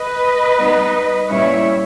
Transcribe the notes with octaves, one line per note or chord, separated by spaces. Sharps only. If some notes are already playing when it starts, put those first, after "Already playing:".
Already playing: B4 D#5
G3 B3 D#4
A#2 G3 C#4 E4 C#5 E5